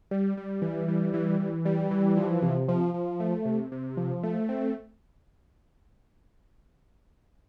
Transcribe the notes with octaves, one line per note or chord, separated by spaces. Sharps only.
G3
G3
E3
G3
E3
E3
G3
E3
F3
C3
F3
F3
A3
C3
C3
F3
A3
C4